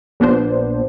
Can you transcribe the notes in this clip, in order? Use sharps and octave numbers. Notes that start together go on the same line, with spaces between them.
A#1 A#2 B3 D4 C5